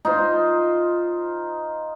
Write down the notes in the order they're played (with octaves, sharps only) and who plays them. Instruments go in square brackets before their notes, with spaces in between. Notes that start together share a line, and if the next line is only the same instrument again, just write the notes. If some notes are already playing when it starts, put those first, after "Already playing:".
[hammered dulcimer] D#4 F4 C5